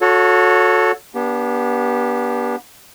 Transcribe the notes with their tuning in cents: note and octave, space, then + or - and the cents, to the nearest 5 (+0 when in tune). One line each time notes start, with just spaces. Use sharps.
F#4 -30 A4 +0 C#5 +10
B3 -30 D4 -20 G4 +0